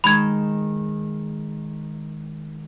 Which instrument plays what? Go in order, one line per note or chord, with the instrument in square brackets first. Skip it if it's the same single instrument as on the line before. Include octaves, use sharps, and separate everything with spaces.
[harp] D#3 G#3 [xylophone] B5 G#6